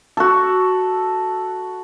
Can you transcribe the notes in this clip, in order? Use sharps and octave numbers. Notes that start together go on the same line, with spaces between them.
F#4 A4